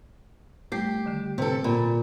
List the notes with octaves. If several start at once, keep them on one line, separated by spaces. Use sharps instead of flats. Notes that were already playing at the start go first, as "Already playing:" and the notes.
G3 A3 G4
D3 D#3
C3 A4 B4
A#2 B5